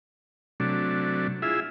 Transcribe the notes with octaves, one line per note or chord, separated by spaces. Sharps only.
C3 F#3 A3 D4
E4 F4 G#4 E5